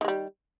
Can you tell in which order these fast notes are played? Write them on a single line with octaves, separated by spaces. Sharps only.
D#3 G#3 G3